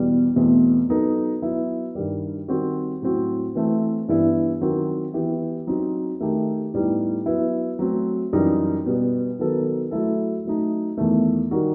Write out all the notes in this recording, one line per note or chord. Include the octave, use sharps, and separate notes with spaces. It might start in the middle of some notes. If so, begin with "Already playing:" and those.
Already playing: E2 B2 G3
E2 B2 A3 C4
F#3 B3 D#4 A4
F#3 B3 E4
G2 D#3 G3
D#3 G3 C4 F#4
A2 F#3 C4 F#4
E3 A3 C4
G2 E3 B3 E4
D#3 F#3 C4 F#4
E3 B3 E4 G4
F#3 C4 D#4
D#3 A3 D#4 G4
A2 G3 B3 D#4 G4
F#3 B3 E4
F#3 A3 C4
F#2 E3 G3 D#4
B2 G3 B3
D#3 F#3 B3 D#4 A4
F#3 A3 E4 A4
F#3 A3 D#4
E2 D#3 A3
D#3 G3 D#4 F#4